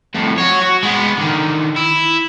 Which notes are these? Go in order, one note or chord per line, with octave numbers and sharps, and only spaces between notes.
F2 A2
F#4 C#5
F#4
G#3 B3
D3 D#3
E4